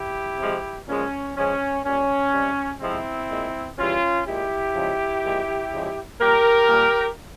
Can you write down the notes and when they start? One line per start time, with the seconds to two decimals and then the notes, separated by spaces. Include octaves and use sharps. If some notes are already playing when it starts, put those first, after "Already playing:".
Already playing: E4 G4
0.38 C3 F3 G#3
0.87 A#2 F3 G#3 C#4
1.36 C#3 F3 G#3 C#4
1.84 A#2 G3 C#4
2.32 C3 G3
2.81 C3 F3 G#3 C4 E4
3.30 A#2 G#3
3.77 C#3 E3 G3 C#4 F4
4.26 A#2 G#3 E4 G4
4.74 C#3 F3 G#3
5.23 A#2 F3 G#3
5.72 C#3 F3 G#3
6.19 A#2 G3 G4 A#4
6.69 A#2 G3